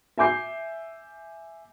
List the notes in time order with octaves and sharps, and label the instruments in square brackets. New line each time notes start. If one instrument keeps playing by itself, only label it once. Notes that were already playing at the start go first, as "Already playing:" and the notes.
[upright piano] E5 G#5 D6 G6 C7